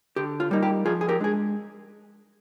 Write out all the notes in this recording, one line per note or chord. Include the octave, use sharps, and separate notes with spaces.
D3 G4
F4
G3 A#3 D#4
G4
F3 F4 G#4
G#4
G4 A#4
G#3 D4 G#4